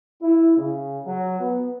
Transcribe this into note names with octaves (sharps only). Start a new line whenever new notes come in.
E4
C#3
F#3
B3